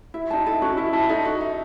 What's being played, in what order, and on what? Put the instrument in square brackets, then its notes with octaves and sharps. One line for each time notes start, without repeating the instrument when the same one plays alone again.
[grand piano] E4 [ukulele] E5
[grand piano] D#4 [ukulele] A5
[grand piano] E4
[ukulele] A4
[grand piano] C#4 [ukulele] F#4
[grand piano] E4 [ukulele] E5
[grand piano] E4 [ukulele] A5
[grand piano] D#4 [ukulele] A4
[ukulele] F#4
E5